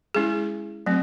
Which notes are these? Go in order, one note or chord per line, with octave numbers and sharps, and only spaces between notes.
G#3 C#4 E4 G#4
F#3 A3 C4